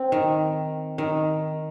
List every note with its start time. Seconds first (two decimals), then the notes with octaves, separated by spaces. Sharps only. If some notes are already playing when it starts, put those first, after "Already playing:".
Already playing: C4
0.12 D#3
0.98 D#3